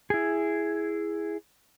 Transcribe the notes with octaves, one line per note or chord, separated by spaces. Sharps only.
E4 G#4